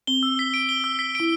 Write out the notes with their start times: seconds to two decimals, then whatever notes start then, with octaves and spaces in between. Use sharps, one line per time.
0.07 C4 G7
0.23 E6
0.39 B6
0.54 D7
0.69 G7
0.84 E6
0.99 B6
1.15 E4 D7